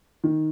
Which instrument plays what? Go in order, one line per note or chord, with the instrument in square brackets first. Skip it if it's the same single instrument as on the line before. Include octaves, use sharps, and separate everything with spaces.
[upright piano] D#3